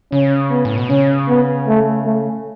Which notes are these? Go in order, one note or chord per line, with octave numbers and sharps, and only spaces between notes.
C#3 C#4
B3
A2
B2
C#3 C#4
B3
A3
A3